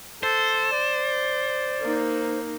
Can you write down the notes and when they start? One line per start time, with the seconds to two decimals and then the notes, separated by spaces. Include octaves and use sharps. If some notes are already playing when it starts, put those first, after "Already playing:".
0.23 A4 C5
0.71 D5
1.81 A#3 D#4